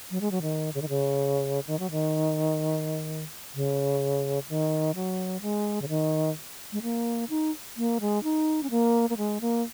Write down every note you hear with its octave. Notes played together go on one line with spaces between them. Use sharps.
F#3
G#3
F#3
D#3
C#3
D#3
C#3
D#3
F#3
D#3
C#3
D#3
F#3
G#3
C#3
D#3
G#3
A#3
D#4
A#3
G#3
D#4
C#4
A#3
A#3
G#3
A#3